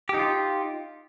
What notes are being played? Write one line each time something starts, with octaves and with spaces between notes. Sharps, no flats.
D#4 F4 G4